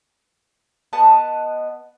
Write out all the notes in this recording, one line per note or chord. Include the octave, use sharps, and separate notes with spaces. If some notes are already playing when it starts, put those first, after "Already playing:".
B3 D#5 F#5 A5